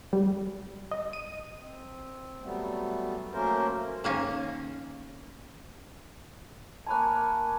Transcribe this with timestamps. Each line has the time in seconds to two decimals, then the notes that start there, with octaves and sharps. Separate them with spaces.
0.13 G3
0.91 D#5
1.13 D#7
1.58 C4
2.42 F#3 G3 A3 B3
3.33 F#3 A3 A#3 C#4 A#4 C5
4.04 D#3 A#3 C#4
6.87 A#3 C#5 G#5 A5 B5 F#6